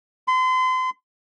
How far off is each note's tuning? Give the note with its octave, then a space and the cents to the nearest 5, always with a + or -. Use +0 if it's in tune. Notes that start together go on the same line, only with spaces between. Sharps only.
C6 -35